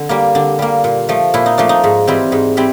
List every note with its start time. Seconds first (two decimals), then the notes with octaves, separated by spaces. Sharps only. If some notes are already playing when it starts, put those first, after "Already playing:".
Already playing: D3
0.09 G3 A#3
0.35 D3 D4
0.59 G3 A#3
0.84 A#2
1.09 F3 A3
1.34 A#2 E4
1.46 D#4
1.58 F3 A3 D4
1.69 D#4
1.84 G#2
2.07 E3 G3 C4
2.32 G#2
2.57 E3 G3 C4